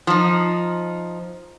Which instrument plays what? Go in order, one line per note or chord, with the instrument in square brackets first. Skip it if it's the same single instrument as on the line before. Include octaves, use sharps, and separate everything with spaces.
[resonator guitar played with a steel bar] F3 D#4